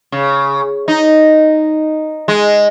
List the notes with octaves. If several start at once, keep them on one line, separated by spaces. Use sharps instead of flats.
C#3
D#4
G#3